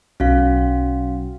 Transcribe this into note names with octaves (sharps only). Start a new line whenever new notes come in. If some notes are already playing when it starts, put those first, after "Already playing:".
B1 C#4 F#4 F5